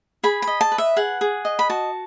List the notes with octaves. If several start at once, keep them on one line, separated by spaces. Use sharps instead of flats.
G#4 B5
B5
D#5
A5
B4
E5
G#4 F#5
G#4
D#5
B5
F#4 A5